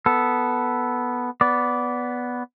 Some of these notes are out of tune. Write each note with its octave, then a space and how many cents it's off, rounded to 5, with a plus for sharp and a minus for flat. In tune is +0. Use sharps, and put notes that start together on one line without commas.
B3 +0 A4 +0
B3 +0 D5 -15